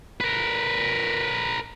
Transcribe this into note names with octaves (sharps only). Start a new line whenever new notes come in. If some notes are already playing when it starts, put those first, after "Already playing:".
A#4 B4